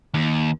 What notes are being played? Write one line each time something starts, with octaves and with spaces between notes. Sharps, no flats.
D#2